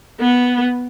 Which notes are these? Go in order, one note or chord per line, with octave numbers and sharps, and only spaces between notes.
B3